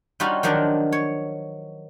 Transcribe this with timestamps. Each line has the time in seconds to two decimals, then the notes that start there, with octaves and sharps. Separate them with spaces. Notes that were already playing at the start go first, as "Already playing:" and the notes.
0.20 G3 C#4 D#4 F4 F#4
0.43 D#3 F3 F#3 D4 D#4 F4
0.92 C#5